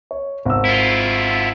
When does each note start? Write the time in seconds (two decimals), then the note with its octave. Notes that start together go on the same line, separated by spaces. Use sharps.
0.11 C#5
0.46 G#1 E6
0.65 E4 F4